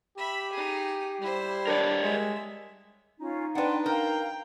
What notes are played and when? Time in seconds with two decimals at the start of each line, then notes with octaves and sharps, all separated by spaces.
0.18 G4 E5 B5
0.53 D#4 G#4
1.22 G3 E4 C5
1.67 D4 A#4 C#5 D5
2.03 G#3 E5
3.20 C#4 D#4 F4
3.55 D4 B4 D5 F#5 G5 C6
3.86 A#4 F5 G5 A#5